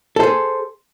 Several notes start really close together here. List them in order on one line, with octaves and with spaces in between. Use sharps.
A4 C5 G#4